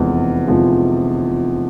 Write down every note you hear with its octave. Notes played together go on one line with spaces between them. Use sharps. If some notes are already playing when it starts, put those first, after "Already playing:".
Already playing: F1 E2 C3 F3 G#3
F1 E2 C3 F3 G#3